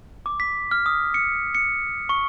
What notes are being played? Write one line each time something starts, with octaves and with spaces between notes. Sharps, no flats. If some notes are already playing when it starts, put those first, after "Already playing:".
D6
B6
F6
D#6
C#7
C#7
C#6